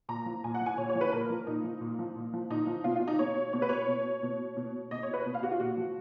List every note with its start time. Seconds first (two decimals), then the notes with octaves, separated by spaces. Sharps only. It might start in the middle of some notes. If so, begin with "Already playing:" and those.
0.09 A#2 A#5
0.26 F3
0.44 A#2 G#5
0.55 F#5
0.61 F3
0.66 G#5
0.77 A#2 C#5
0.89 C#5
0.95 F3
1.01 B4
1.13 A#2 A#4
1.30 F3
1.47 A#2 D#4
1.64 F3
1.81 A#2
1.99 F3
2.16 A#2
2.34 F3
2.50 A#2 D#4
2.67 F3
2.84 B2 F4
2.96 F4
3.08 D#4
3.19 B2 C#5
3.53 B2 C#5
3.62 B4
3.69 C#5
3.88 B2
4.23 B2
4.57 B2
4.91 B2 D#5
5.03 C#5
5.14 B4
5.26 B2
5.34 F5
5.43 F#4
5.51 F4
5.60 A#2 F#4
5.77 F3